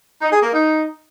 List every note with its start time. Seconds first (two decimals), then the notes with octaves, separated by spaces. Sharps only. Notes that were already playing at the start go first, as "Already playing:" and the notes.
0.22 D#4
0.32 G#4
0.43 A#3
0.53 D#4